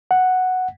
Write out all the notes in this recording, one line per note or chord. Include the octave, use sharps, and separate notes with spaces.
F#5